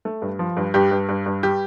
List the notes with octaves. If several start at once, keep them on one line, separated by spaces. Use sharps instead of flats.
A3
G2
F3
G2
G2 G4
G2
G2
G2
G3 G4